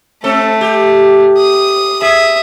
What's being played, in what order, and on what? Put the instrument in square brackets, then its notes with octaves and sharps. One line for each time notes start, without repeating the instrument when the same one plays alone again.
[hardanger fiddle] A3 [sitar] C4 A4
[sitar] G4
[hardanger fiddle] D#6
[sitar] G#4 [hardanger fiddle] E5 D#6